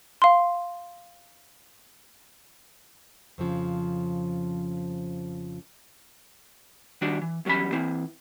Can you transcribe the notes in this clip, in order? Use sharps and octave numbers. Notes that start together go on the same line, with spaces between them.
F5 C6
F2 C#3 F3
D#3 G3 D4 F#4 D5
E3
E2 F#3 G3 C#4 B5
E3 C4 E4